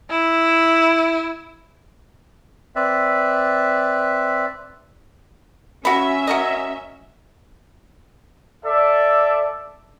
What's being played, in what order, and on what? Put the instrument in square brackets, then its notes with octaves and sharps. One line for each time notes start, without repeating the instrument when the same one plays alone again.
[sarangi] E4
[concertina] C4 B4 D5 E5
[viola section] C#4 E5 [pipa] F#4 B5
[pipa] F#4 A#4 D#5
[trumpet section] A4 D5 E5